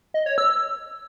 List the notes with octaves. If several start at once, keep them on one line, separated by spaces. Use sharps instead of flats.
D#5
C#5
E6